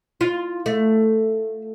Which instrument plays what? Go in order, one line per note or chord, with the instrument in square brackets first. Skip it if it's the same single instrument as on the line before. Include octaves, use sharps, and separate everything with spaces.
[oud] F4
A3